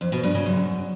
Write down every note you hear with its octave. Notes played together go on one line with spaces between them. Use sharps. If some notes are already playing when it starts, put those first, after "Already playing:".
F2
B2
G2
C#3
F#2